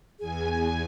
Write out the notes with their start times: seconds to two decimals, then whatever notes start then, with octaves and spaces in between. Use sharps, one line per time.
0.19 E2 G#4 G#5